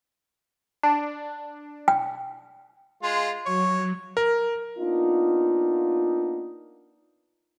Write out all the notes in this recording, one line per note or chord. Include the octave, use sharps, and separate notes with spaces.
D4
G5
G#3 F4
F#3 C#5
A#4
A#3 B3 D4 D#4 F4